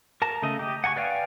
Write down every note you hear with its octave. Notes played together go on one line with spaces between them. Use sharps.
A#4 A5 A#5
C#3 A3 D#5
G4 D#5
F#5 G#5 A5 C#6
B4 D5 F5 G5 G#5